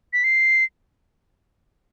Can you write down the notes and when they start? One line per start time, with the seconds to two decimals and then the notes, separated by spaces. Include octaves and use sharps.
0.13 B6
0.24 C7